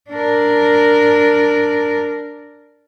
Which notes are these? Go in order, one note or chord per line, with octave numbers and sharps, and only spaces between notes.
D4 A#4